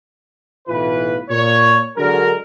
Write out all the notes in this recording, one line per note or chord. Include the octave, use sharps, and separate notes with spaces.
B1 A2 E3 F4 B4
A#2 C#5
D3 F#3 G#3 D4 A#4